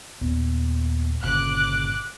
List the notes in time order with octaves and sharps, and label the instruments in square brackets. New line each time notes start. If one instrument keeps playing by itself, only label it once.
[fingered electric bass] D#2 A#2 B3
[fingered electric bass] G1 A#2 C#3 [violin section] D6 F#6